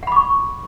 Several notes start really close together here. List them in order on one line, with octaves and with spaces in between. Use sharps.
F#5 B5 D6 C#6